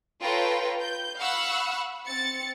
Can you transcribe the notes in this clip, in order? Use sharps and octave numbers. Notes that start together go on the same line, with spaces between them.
F4 A4 B4 C#5 G5 A#5
G6
F5 F#5 B5 C#6 E6 F#6
C4 A6 C#7